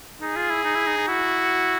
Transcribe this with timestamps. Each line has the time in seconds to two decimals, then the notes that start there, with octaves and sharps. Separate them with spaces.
0.21 D#4 G#4
0.36 F4
0.50 E4
0.64 D#4
0.75 E4
0.87 D#4
0.97 D#4
1.07 E4 F#4